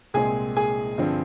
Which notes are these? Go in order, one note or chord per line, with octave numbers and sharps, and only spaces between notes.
C2 A#2 G#3 C4 G#4 G#5
G#4 G#5
G2 D3 F3 C4